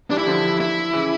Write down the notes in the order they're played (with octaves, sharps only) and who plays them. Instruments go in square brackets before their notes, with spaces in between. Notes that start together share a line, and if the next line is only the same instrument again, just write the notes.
[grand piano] E3 G3 [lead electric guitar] D4
[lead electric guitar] E4
[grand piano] D3 F3
[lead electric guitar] E4
[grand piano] C#3 E3